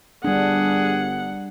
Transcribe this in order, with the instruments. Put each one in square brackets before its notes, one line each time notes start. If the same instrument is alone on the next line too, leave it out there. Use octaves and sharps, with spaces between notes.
[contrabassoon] G1 [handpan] G3 D4 [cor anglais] G#4 [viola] F#5